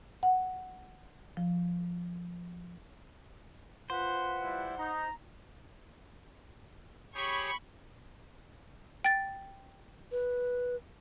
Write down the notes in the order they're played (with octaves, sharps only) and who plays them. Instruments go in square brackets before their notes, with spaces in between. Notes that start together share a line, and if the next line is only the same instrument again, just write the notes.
[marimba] F#5
F3
[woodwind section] F4 B4 [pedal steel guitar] C5 [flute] F#5
[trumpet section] G3 E4
[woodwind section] D#4 [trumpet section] A#5
[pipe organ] G4 G#4 C#5 [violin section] B5 C#6
[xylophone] G5 A6
[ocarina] B4